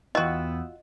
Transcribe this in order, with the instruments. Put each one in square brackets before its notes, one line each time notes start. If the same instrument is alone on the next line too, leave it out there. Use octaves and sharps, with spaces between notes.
[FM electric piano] E2 G5 E6 [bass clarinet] B3 [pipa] F4 F#4 [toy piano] D#5